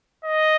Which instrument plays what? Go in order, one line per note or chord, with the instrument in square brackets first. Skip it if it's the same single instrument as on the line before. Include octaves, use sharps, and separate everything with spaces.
[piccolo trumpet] D#5